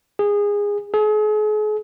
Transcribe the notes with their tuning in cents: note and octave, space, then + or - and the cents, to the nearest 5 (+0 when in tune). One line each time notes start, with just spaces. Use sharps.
G#4 -20
G#4 +40